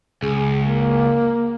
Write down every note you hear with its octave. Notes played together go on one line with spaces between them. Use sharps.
C#2 G#4
A#3